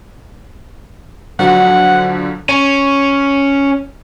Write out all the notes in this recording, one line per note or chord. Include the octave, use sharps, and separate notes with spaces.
D3 F3 F#3 F#5
C#4